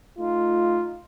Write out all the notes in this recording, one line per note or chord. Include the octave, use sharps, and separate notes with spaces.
A3 D#4 F4